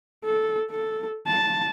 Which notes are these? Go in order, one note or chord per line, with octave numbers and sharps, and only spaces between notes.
A4
A4
A5